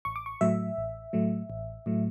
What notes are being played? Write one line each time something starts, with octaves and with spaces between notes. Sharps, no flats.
A1 C#6
D6
C#6
A2 F#3 A3 E5
A1
A2 F#3 A3
A1
A2 F#3 A3